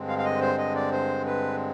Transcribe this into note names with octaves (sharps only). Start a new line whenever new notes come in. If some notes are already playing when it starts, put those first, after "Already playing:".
Already playing: G2 D3 G#3 C4
F5
F5
D#5
C5
D#5
D5
C5
B4